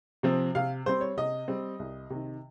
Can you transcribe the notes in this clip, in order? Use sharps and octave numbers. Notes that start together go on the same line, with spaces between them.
C3 F3 C4
C3 F5
G3 C4 C5
C#5
C3 D#5
G3 C4
C2
C3 D#3